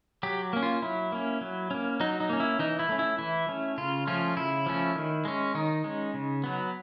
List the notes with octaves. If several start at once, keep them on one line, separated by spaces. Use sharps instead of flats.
F#3 G4
A#3 C#4
F4
F#3 E4
A#3 C#4
F#3
A#3 C#4
F#3 D#4
D#4
A#3 C#4
E4
E3 D#4
E4
A3 C#4
E4
E3 E4
A3 C#4
C#3 F4
F3 A3 C#4 F4
C#3 E4
F3 A3 C#4
D#3
G#3 C#4
D#3 D#4
G#3 C#4
C#3
F#3 B3